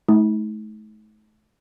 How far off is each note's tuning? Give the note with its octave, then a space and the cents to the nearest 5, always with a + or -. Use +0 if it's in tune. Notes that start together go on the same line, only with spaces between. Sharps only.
A3 -35 D#4 +45